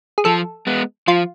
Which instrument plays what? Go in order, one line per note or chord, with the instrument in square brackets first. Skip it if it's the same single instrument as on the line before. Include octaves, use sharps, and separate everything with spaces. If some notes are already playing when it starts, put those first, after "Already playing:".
[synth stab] G#4
[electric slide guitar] F3 [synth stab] A4
[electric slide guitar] G#3 B3
[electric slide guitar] F3 [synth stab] F4